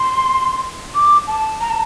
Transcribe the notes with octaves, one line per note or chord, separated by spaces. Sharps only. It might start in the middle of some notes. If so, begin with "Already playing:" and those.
Already playing: C6
D6
A5
A#5
A5